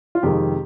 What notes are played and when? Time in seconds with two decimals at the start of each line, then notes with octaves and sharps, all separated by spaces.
0.15 F4
0.23 F2 C3 D#3 G#3 G4